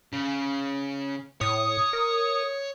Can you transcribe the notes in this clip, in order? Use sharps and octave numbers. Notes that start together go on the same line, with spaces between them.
C#3
A2 C#5 D#6
A#4